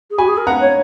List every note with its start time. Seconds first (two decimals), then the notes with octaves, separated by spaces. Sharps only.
0.10 G#4
0.18 F#4 G#5 B5
0.28 G#4
0.37 A#4
0.46 B4 F#5 A#5
0.60 C#5